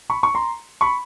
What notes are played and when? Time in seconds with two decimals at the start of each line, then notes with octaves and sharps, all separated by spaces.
0.10 B5 C#6
0.23 C#6
0.34 A#5 C6
0.81 B5 C#6